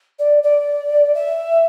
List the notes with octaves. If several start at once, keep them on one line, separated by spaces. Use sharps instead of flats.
D5
D5
E5